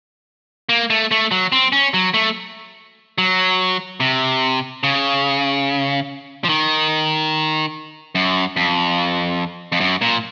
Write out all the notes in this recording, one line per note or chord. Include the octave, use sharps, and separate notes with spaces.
A#3
A3
A3
F#3
C4
C#4
F#3
A3
F#3
C3
C#3
F3
D#3
F#2
F2
F2
F#2
A#2